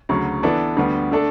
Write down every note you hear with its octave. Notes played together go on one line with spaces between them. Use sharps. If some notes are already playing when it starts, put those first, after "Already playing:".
D2 C#3 F#3
E3 B3 D4 A4
D2 D3 G3 B3
D3 A3 D4 A4